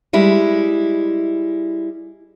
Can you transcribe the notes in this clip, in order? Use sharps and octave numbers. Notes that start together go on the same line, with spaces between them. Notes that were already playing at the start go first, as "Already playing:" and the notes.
G3 G#3 E4